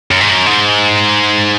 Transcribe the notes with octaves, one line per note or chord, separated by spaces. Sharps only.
F#2
G#2
F#2
G#2